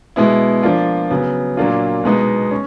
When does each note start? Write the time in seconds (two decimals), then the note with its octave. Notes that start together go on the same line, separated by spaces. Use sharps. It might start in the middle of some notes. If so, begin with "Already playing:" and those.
0.16 B2 G#3 B3 E4
0.63 F3 A#3 D4 F4
1.11 C#3 F#3 B3
1.57 A#2 F#3 A#3 D4 F4
2.04 B2 G#3 B3 D#4
2.51 C#4